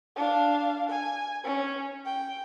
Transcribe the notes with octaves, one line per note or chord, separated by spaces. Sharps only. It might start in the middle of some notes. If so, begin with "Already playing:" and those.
D4 F5
G#5
C#4
G5